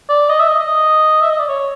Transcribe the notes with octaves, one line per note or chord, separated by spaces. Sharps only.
D5
D#5
E5
D#5
D#5
E5
D#5
D5
C#5